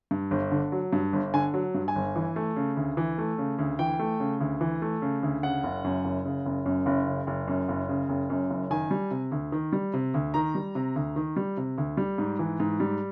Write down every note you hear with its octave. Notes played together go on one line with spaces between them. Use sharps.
G2
G1
D3
F#3
G2
G1
D3 G#5
F#3
G2
G#5
G1
E3
A3
C#3
D2
E3
A3
C#3
D2
E3 G5
A3
C#3
D2
E3
A3
C#3
D2
C#3 F#5
F#1
F#2
F#1
C#3
F#1
F#2
F#1
C#3
F#1
F#2
F#1
C#3
F#1
F#2
F#1
D#3 G#5
G3
C3
D2
D#3
G3
C3
D2
D#3 A#5
G3
C3
D2
D#3
G3
C3
D2
G3
G#2
E3
G#2
G3